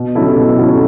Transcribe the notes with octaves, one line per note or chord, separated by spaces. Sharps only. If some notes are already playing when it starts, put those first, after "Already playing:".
Already playing: B2
F#3 C#4 E4 A4
B2
F#3 C#4 E4 A4